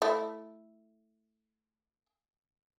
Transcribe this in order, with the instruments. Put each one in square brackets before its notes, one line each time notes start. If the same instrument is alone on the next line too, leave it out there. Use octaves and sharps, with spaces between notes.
[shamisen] A3 E4